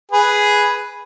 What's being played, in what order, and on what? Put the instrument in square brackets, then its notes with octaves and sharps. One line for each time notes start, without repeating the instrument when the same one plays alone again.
[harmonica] G#4 B4